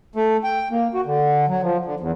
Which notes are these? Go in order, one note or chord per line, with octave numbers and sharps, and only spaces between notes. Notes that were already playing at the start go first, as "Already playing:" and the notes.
A3
G5
A#3
F#4
D3
F#3
F3
D3
E2